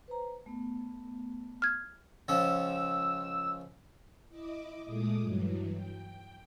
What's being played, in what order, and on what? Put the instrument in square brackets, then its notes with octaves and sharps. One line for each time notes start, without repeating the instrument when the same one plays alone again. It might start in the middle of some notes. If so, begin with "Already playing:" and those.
[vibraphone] B4 C5 A#5
A3 B3
[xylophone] F6 G#6
[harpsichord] C#2 F3 C#4 [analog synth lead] E6
[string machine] E4 D#5 D6
A#2 G#3 A3 D6 D#6
G2 E3 F#3
G5